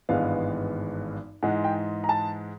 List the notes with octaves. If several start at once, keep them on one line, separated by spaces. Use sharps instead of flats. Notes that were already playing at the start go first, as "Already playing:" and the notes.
G#1 G2 E3 G#3 B3 F5
G#2 E3 G#3 F#5
G5
A#5
A5